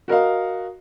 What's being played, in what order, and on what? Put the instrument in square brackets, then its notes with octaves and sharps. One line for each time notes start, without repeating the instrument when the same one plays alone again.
[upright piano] F#4 A#4 D#5 F5